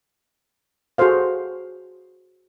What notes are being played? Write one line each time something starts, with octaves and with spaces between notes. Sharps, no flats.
F#4 G#4 A4 C5 F5